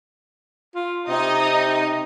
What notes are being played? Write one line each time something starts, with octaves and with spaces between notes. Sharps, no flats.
F4
C3 D#4 D#5